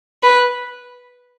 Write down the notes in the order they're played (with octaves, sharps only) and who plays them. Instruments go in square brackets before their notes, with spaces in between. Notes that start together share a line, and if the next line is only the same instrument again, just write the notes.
[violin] B4